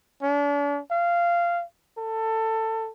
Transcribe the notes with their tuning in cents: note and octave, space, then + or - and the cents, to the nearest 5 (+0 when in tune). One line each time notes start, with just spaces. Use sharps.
D4 -40
F5 -15
A4 +20